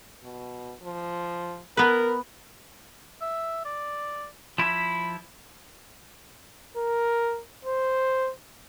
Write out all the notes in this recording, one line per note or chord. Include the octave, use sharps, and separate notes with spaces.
B2
F3
B3 A#4 B4
E5
D5
F3 E4 B5
A#4
C5